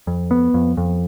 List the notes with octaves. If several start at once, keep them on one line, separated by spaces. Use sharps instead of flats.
F2
B3
F2
F2